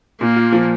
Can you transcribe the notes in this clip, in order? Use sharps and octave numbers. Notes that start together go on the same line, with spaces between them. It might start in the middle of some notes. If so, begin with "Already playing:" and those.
A#2 A#3
F4
F3